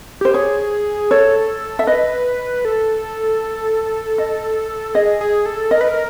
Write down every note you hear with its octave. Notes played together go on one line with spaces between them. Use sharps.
G4 C5
G#4 C#5
A4 C#5
E5
B4 D#5
A4
D#5
G#4 D#5
G#4
A4
A#4 D#5
B4
A#4